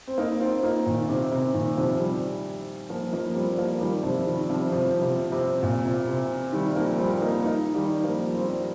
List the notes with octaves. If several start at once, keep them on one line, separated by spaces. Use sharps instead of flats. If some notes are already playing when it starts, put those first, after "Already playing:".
C4
A#3 D#4
C4 F4
A#3 D#4
A#2 D#3
C3
C3
A#2 D#3
C3 F3
D#3 G3
F3 A#3
F3 A#3
G3 C4
F3 A#3
D#3 G3
C3 F3
D#3 G3
C3 F3
C3 F3
C3
C3
A#2
C3
C3
D#3 G3
F3 A#3
G3 C4
A#3 D#4
A#3 D#4
D#3 G3
F3 A#3
G3 C4